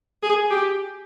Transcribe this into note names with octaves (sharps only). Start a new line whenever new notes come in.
G#4
G4